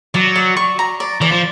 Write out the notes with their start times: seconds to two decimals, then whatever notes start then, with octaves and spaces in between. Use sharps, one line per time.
0.14 F#3 D5
0.36 D5
0.57 C#6
0.79 A#5
1.00 D5
1.21 E3 D5
1.32 F3